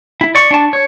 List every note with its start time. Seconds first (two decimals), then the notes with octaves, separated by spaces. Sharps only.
0.21 E4
0.35 D5 C#6
0.51 D4 A5
0.73 C#5